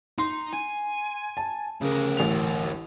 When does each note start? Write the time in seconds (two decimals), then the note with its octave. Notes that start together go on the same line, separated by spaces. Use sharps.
0.18 D#4 C6
0.53 G#5
1.37 A5
1.81 D2 C#3 A#4
2.17 A1 F7